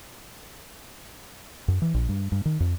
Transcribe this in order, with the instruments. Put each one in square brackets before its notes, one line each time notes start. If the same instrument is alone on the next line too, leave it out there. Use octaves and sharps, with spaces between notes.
[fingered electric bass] F#2
E3
A#1
G2
G2
D#3
F2